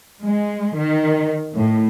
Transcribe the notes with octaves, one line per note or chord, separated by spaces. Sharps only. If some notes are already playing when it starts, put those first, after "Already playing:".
G#3
D#3
A2